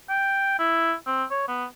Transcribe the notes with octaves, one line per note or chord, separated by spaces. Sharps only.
G5
E4
C4
C#5
B3